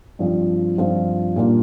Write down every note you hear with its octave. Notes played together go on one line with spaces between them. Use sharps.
G2 F3 C4 F4
G2 F3 C4 F4
A#2 G3 A#3 D4 F4